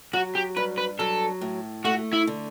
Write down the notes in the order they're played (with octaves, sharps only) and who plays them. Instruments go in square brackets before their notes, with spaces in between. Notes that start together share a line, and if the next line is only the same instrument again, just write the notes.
[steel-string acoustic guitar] F#3 [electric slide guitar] F#4
[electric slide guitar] G4
[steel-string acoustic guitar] G2 [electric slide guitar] B4
[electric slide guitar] B4
[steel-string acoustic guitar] F#3 [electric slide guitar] A4
[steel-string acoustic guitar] A2
[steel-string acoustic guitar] A3 [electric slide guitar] F#4
[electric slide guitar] E4
[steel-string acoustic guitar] D3